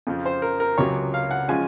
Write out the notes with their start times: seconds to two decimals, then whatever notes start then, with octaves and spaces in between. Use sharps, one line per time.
0.07 F2 C#3 F3
0.26 C5
0.42 A#4
0.60 A#4
0.78 C#2 C3 F#3 C#5
1.14 F5
1.31 F#5
1.48 F3 G#3 C#4 F4 G#5